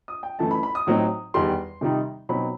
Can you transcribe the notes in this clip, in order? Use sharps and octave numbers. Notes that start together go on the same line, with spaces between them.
D#6
G5
F#2 E3 A3 A5
B5
B5
D#6
A2 F#3 C4 D#4
E2 D#3 G3 C6
C3 D#3 G3 D#4
B2 F#3 C4 D#4 B5